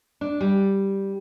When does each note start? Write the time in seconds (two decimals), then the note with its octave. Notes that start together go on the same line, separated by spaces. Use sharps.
0.21 D4
0.41 G3